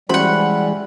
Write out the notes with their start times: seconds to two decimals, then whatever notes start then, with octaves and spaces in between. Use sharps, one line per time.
0.09 E3 G3 G#3 C#4 F#4 C5 F#5 B5